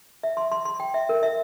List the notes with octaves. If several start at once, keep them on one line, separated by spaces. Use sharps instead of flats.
E5
C6
C6
C6
G5
E5
A#4
E5